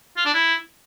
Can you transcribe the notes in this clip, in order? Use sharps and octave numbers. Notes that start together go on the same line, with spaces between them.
F4
D4
E4